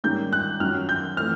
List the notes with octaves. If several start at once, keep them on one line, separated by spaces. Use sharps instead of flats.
G#2 D#3 G3 A#3 C#4 G6
F#6
F#2 D#3 F#3 F6
G6
E3 A3 C4 F6